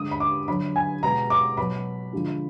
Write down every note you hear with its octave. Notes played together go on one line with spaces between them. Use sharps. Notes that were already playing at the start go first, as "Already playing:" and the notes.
Already playing: D3 G#3 D#6
B5
D6
D3 F#3 B5
G#5
B2 G#3 A#5
D6
B2 F#3 B5
D3 F3 G#3